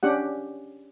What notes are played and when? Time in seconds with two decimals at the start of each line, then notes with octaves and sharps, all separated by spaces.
0.03 C#4 D4 G4 F#5